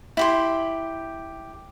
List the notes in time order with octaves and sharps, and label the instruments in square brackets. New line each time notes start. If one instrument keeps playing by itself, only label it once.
[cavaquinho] E4 G4 C6